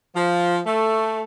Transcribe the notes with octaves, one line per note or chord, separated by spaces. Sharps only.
F3
A3